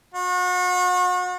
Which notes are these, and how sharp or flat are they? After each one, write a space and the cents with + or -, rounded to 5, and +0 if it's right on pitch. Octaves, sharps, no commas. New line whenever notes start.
F#4 -35